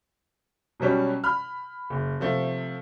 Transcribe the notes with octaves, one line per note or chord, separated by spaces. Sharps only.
B2 F#3 G3 C#4
B5 F6
F#1
C3 F3 A3